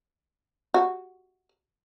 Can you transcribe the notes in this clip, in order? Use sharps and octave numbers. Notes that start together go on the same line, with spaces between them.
F#4